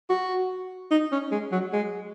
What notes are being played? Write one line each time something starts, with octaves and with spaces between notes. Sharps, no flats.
F#4
D#4
C#4
G#3
F#3
G#3